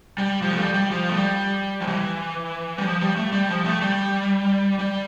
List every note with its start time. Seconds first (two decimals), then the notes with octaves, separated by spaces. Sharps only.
0.18 G3
0.42 F3
0.51 A3
0.59 G3
0.74 G3
0.91 F3
1.09 A3
1.15 G3
1.81 F3
1.87 E3
2.78 G3
2.85 F3
3.01 G3
3.16 A3
3.32 G3
3.49 F3
3.65 A3
3.81 G3
4.79 G3